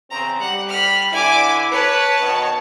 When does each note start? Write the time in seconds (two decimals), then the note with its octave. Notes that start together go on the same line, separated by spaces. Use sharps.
0.11 E2 C#3 C4 A#5
0.40 G3 F#5
0.69 B5 F6
1.12 D3 E4 G#5 D6
1.72 B4 C#5 A5
2.20 B2 D#3